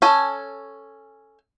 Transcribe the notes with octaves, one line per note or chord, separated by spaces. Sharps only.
C#4 A4 G#5